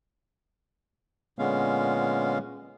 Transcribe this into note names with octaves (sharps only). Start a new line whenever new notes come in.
A#2 D3 G#3 B3 C#4 F5